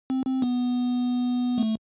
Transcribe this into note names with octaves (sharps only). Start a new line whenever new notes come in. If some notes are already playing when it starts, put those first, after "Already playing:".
C4
C4
B3
A3